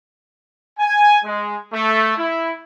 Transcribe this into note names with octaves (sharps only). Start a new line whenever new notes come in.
G#5
G#3
A3
E4